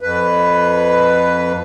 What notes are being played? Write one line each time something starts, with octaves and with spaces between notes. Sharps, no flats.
F2 B4